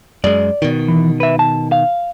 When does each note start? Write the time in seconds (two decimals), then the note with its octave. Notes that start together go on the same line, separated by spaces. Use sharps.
0.24 F#2 G#3 D5
0.62 B2 D#3
0.88 E3
1.20 B4 E5
1.39 A5
1.72 F5